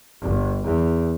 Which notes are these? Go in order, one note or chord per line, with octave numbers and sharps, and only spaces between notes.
G1
E2